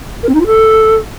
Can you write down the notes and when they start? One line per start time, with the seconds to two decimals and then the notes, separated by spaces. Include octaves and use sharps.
0.23 A#4
0.29 C4
0.35 D#4
0.40 F4
0.46 A4